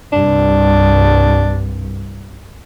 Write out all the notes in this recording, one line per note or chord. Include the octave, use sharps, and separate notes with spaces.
C2 G2 D4